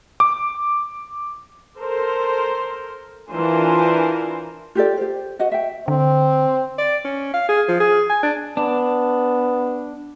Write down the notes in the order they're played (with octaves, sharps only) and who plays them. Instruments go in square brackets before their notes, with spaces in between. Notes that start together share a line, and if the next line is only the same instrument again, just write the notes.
[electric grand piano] D6
[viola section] A4 A#4 C5
E3 D4 F4 A#4 C5 G#5
[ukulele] F4 G4 A4 D5
G4 C5
F#4 B4 D#5 F#5
E5 G5
[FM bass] D3 [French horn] C4
[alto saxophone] D5
C#4
F5
G#4
F3
G#4
G#5
D4
[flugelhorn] B3 [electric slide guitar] D4